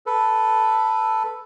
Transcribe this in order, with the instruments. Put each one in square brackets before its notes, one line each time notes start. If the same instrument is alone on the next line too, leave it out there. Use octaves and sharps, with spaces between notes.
[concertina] A4 B4